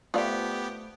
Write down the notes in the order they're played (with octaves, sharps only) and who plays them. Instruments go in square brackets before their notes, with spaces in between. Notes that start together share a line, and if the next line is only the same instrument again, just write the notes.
[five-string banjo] A3 C5 D5 [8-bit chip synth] B3 G4 [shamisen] F4 F5